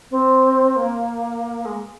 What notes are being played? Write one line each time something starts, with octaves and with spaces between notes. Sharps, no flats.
C4
A#3
G#3